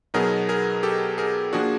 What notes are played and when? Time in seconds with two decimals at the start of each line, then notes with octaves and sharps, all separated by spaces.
0.14 B2 F#3 B3 D#4 G#4 A#4
0.49 G#4 A#4
0.83 G4 A4
1.18 G#4 A#4
1.53 F3 A#3 D4 F#4 G#4